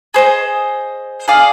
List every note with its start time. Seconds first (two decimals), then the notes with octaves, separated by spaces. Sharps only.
0.14 G#4 C5 D#5
1.28 G#4 D5 F5